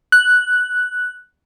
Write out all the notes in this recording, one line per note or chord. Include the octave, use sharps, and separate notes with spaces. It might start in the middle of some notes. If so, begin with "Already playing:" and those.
F#6